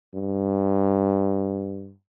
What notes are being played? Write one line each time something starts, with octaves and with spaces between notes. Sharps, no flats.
G2